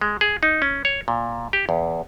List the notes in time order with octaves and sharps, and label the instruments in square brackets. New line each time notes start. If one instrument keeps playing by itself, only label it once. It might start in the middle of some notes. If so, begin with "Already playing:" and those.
[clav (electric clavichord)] G#3
G#4
D#4
C#4
C#5
A#2
G4
E2